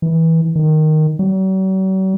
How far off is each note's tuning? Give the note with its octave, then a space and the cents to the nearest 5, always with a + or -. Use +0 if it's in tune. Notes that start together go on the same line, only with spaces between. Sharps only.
E3 -20
D#3 -5
F#3 +45